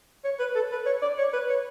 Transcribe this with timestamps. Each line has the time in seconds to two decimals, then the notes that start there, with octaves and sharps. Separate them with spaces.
0.24 C#5
0.39 B4
0.55 A4
0.71 B4
0.86 C#5
1.02 D5
1.18 C#5
1.33 B4
1.49 C#5